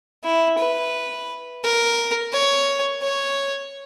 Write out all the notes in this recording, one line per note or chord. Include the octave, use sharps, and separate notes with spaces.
E4
B4
A#4
C#5
C#5